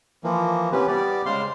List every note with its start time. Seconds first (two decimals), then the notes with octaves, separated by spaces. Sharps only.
0.24 E3 F3 A#3
0.72 C3 E3 B3 C#4 G4 B4
0.88 G3 B3 G4 D5
1.26 C#3 G#3 C5 F5 C6